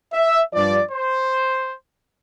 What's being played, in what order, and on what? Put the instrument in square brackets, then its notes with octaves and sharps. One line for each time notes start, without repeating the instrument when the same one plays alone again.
[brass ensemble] E5
G2 F3 D5
C5